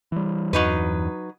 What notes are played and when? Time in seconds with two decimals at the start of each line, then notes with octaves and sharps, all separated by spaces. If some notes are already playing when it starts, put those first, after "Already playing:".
0.12 E3 G3
0.53 E2 G2 E3 F#3 D#4 B4